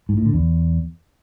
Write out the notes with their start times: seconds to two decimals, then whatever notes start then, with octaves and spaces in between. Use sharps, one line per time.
0.09 G#2
0.17 A2
0.25 D3
0.34 E2